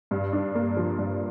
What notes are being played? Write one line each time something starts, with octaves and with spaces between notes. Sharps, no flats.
G2
D4
A#3
F3
G2